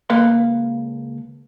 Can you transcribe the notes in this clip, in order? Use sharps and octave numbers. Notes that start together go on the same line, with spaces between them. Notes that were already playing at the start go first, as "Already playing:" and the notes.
C#2 A#3 A4 B4 F5 C6